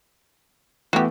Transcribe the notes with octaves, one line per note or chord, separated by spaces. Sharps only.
E3 A3 B3 F#4 G4